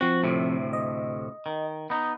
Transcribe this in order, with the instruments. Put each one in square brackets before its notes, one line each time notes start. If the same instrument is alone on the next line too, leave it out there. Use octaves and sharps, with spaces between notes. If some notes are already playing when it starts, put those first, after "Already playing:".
[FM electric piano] F3 C4 [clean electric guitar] F#4
[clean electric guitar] D2 A2 C3
[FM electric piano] D#5
[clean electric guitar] D#3
B3 D#4